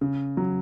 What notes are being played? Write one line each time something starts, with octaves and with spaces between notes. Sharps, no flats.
C#3
F#3